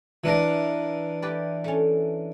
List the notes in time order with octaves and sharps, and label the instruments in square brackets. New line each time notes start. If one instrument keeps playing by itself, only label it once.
[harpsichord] E3 D4 A#4
[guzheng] G4 B4 D5
A3 C#4